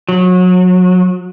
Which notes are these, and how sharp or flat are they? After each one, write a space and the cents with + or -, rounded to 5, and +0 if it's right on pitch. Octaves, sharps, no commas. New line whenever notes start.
F#3 -25